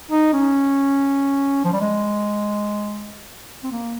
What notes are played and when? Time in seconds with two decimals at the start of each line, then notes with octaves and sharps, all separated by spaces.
0.11 D#4
0.33 C#4
1.64 F3
1.73 G3
1.81 G#3
3.63 C4
3.71 A#3